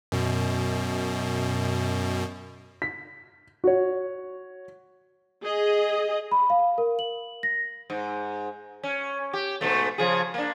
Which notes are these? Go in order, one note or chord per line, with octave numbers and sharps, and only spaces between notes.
F#2 B2
B6
F#4 C#5
G#4 D#5
B5
F5
A#4
F#7
A#6
G#2
C#4
G4
G#2 B2 A3
C#3 F3 G#4
A#3 D4